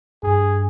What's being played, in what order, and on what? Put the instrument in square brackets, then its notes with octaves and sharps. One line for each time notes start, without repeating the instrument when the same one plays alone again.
[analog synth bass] G2 [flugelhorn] G#4